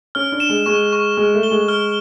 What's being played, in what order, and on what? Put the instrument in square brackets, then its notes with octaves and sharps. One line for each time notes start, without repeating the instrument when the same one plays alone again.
[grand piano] C#4 [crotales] F6
[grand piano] D4
[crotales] E7
[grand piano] G#3
[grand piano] G#3 [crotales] C#6
[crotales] C#6
[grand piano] G#3 [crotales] F6
[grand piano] A3
[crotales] G7
[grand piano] G#3
[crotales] F6